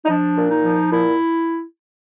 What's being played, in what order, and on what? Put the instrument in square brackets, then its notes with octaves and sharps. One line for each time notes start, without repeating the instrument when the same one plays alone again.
[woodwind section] D#4
F3 D4
A#2
D#4
F3
A#2 E4